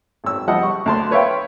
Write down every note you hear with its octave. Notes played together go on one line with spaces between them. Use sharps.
G#1 E6
F3 G3 D#5 F#5 A5
C#6
D2 A5 C6
B4 C#5 E5 F5 G5 C6